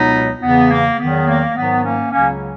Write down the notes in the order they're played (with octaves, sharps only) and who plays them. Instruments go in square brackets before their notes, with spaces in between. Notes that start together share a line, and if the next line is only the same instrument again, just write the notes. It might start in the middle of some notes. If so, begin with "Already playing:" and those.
Already playing: [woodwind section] C#2 B2 F#3 B3 D#4
E2 C#3 E3 B3
A#3
E2 D#3 F#3 B3
A#3
G#2 D#3 F#3 B3
A#3 C#4
C#2 C#3 F#3 A#3 C#4